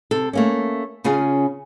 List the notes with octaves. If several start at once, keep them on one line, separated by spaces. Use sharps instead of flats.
C3 A4
A3 A#3 C#4
C#3 C#4 F4 G#4 G#5